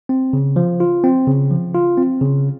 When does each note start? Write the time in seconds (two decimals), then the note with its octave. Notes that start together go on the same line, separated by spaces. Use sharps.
0.09 C4
0.33 C#3
0.56 F3
0.80 F4
1.04 C4
1.27 C#3
1.51 F3
1.74 F4
1.97 C4
2.21 C#3